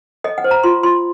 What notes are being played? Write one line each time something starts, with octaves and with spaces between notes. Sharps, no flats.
A4 D#5
F#5
C5
A#5
F4 C6
F4 C6